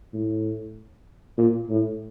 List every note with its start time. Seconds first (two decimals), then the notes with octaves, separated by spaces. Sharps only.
0.13 A2
1.37 A#2
1.70 A2